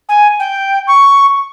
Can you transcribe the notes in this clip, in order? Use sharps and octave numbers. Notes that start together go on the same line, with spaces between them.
G#5
G5
C#6